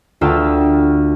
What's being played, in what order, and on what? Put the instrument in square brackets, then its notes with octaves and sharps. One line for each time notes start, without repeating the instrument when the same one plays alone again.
[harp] D2 F4 G5 A5 E6